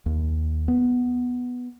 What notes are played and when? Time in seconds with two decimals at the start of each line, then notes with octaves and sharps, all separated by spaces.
0.06 D#2
0.68 B3